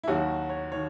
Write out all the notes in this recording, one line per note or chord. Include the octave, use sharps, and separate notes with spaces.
E4
D#2 D#3 F#3 F#4
C#5
D#3 C#5